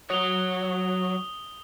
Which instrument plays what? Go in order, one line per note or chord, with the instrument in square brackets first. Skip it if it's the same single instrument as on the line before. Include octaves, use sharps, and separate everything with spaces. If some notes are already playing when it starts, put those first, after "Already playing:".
[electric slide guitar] F#3 C#5 [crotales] D#6 F7 G7